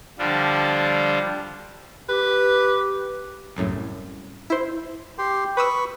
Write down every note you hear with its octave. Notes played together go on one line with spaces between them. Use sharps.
D3 F3 G3 D4
G4 B4
C2 F#2 A2
E4 C5
G4 G5 C6
B4 B5 C#6 D#6 E6